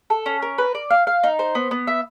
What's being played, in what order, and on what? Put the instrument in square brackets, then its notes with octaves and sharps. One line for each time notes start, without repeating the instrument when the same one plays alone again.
[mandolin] A4
C#4
A#4
B4
D5
F5
F5
D#4
C5
B3
B3
E5